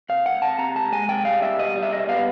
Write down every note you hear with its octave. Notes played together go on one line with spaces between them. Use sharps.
C3 F5
C#2 F#5
C3 A5
C3 A#5
C#2 A5
G#3 G#5
C3 G5
G3 F5
C2 E5
B2 D#5
G3
E5
C2 D#5
B3 F5